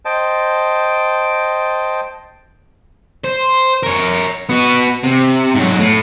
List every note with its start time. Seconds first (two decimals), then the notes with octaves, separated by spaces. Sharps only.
0.05 C5 D#5 G5 A5
3.25 C5
3.83 A#4 C#5
4.49 B3 F#4
5.04 C3
5.56 G#2 F#3
5.79 A2